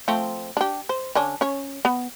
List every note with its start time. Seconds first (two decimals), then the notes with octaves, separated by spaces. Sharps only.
0.08 F3 A3 C4
0.57 D4 G4
0.89 C5
1.15 D3 C#4 D4
1.41 C#4 C#5
1.85 B3